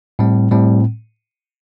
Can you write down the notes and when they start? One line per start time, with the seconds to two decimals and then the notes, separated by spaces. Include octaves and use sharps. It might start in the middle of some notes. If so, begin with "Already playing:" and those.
0.19 A2 G3 C4
0.51 A2 G3 C4